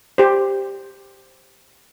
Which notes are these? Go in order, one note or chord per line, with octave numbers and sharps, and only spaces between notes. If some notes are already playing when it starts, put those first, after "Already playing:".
G4 C5